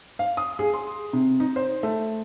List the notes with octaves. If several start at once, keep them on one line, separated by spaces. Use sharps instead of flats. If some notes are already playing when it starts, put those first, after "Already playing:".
F5
D#6
G#4
C6
C3
D#4
C5
A3